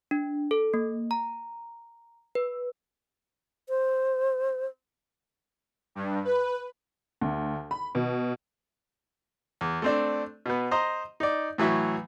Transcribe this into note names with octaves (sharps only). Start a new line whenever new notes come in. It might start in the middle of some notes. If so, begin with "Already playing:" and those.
D4
A4
A#3
A#5
B4
C5
G2
B4
D2
B5
B2
E2
A3 C4 D4
B2 B3
C5 D#5 A#5
D#4 D5
A2 E3 F#3 E5 C#6